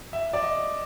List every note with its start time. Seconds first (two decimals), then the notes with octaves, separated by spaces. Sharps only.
0.13 E5
0.33 D5
0.43 D#5